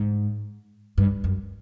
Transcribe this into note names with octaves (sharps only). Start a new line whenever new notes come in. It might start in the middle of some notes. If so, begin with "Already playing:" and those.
Already playing: G#2
G2
F#2